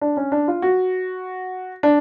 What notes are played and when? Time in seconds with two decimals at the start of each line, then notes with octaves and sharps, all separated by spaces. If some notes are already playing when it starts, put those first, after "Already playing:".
0.01 D4
0.17 C#4
0.32 D4
0.48 F4
0.62 F#4
1.83 D4